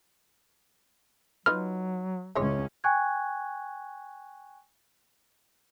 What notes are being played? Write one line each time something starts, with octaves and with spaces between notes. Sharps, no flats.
F#3 D#4 F4 B4 F6
C#2 E3 G#3 C#4 C#5
G5 G#5 C#6 F#6 G#6